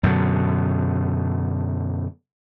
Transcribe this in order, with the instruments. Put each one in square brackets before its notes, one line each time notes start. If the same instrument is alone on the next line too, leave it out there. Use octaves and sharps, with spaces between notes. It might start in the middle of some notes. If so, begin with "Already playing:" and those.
[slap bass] F#2 B2 D3